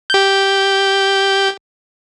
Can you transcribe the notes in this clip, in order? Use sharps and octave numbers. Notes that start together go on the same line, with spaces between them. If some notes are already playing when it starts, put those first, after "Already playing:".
G4 G6